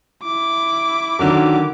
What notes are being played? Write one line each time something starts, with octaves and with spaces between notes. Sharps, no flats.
E4 D6
D3 D#3 F#3